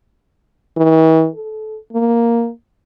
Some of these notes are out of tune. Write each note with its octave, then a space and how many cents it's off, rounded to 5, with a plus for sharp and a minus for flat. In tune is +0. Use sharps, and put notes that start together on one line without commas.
E3 -45
A4 -25
A#3 +0